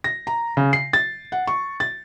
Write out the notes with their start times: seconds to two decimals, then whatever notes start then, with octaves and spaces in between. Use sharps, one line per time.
0.04 A#6
0.27 A#5
0.57 C#3
0.73 C7
0.93 A6
1.32 F#5
1.47 C#6
1.80 A6